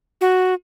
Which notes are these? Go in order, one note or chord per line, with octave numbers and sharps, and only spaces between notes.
F#4